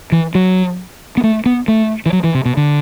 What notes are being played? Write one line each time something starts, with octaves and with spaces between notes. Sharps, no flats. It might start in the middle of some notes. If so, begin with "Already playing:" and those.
E3
F#3
B3
A3
B3
A3
E3
F#3
E3
C3
B2
D3